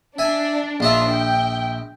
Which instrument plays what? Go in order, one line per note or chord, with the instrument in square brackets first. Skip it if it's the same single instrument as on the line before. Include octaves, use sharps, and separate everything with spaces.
[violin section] D4 [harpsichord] E5 G#5
[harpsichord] A#1 D#5 E5 [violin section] D4 F4
[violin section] G5